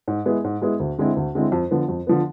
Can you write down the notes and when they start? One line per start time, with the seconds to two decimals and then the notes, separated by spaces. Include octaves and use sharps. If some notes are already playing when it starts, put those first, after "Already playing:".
0.08 G#2
0.26 G#3 B3 E4 G#4
0.44 G#2
0.62 G#3 B3 E4 G#4
0.80 D2
0.98 D3 G#3 C4 E4
1.17 D2
1.35 D3 G#3 C4 E4
1.52 F2
1.71 D3 F3 B3
1.88 F2
2.07 D3 F3 B3